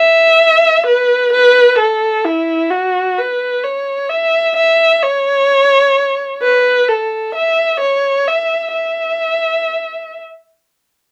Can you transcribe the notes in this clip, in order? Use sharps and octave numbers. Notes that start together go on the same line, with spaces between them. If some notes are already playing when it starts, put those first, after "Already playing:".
Already playing: E5
B4
B4
A4
E4
F#4
B4
C#5
E5
E5
C#5
B4
A4
E5
C#5
E5
E5